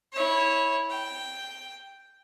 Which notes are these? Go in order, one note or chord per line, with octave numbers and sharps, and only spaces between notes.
E4 C#5
G5